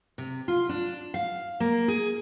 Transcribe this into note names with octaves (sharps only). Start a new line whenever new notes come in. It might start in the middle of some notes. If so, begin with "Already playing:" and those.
C3
F4
D4
F5
A#3
G#4